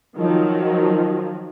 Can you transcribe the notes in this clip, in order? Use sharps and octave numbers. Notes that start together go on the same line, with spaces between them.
D#3 F3 F#3